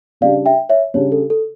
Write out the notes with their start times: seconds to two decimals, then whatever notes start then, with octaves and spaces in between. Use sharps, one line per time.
0.21 C#3 G3 D4 D5 F5
0.46 E5 G5
0.69 C#5 E5
0.94 C#3 G3 D4 C#5
1.12 A4
1.30 A4